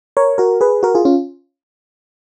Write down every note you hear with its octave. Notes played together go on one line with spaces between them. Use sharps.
A#4 C#5
F#4 A#4
G#4 B4
F#4 A#4
F4 G#4
C#4 F4